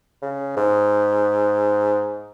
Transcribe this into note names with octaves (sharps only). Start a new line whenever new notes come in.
C#3
G#2